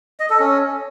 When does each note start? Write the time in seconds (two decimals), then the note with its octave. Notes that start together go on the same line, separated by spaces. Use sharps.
0.20 D#5
0.30 A4
0.40 C#4